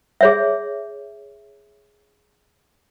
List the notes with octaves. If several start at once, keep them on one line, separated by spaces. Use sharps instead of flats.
G#4 C#5 E5